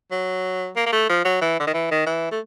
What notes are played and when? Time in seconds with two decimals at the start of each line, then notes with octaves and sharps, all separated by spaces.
0.11 F#3
0.76 A#3
0.86 A#3
0.92 A3
1.09 F3
1.25 F#3
1.41 E3
1.60 D3
1.67 D#3
1.74 E3
1.91 D#3
2.06 E3
2.31 A3